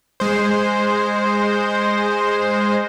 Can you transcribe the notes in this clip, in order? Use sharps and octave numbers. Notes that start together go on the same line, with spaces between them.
G#3 C5